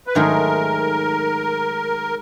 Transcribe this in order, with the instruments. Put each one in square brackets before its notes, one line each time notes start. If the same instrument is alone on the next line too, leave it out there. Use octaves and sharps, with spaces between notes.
[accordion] B4
[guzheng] G#2 D#3 F#3 A3 [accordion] A#4